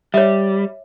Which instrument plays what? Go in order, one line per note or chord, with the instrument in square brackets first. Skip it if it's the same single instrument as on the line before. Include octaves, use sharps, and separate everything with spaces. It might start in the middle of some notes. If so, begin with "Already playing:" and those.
[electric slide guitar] G3 [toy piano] C#5 E5